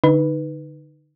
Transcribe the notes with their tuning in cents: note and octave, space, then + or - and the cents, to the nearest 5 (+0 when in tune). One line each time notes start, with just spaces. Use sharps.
D3 +0 D#4 +0 B4 +0